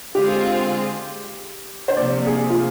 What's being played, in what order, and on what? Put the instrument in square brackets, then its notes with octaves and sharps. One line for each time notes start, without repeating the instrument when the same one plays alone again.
[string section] D3 G#3 C4 F4 G#4 [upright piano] G4
[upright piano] C5
[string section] C3 F3 A#3 [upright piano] D5
[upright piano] G#4
F4